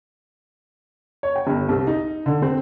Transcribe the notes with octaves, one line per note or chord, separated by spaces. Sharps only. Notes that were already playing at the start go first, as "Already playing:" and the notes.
C#5
G5
G1
C2
D#4
D3
C4